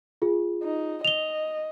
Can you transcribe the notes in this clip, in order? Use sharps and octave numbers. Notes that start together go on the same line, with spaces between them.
F4 G#4
D#4
D#5 F7 G7